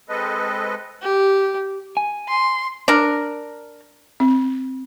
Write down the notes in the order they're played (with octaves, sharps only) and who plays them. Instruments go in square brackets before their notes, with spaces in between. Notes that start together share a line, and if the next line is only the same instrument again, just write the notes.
[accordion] G#3 C4 A4 B4 D#5
[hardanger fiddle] G4
[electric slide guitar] G#5
[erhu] C6
[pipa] D4 A#4
[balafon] C4